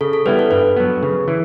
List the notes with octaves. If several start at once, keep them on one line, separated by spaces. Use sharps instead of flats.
C#3 A4
A4
G3 B3 E4 B4
A4
G2 B4
F#3 B3
C#3
E3